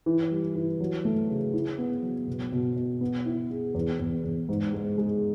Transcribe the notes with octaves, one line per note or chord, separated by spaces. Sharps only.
E3
G3
E3
F#3
A3
C#3
E4
B3
F#3
B2
B2
B2
B3
E4
G#4
E2
E2
E2
G#2
G#3
G#3